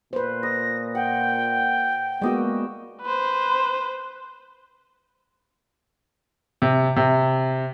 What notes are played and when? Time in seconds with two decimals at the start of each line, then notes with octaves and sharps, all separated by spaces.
0.13 A#2 B4 C5
0.43 D#5 A#6
0.95 F#5 G5
2.22 G#3 A#3 B3 F#4 D5 D#5 E6
3.02 B4 C5
6.62 C3
6.96 C3